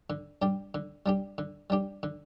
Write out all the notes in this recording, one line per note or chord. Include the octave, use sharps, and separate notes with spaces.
D3
G3 D4 G4
D3
G3 D4 G4
D3
G3 D4 G4
D3